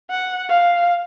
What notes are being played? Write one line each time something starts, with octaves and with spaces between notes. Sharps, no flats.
F#5
F5